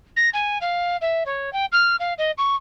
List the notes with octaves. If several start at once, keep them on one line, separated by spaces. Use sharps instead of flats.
A#6
G#5
F5
E5
C#5
G5
F6
F5
D#5
C#6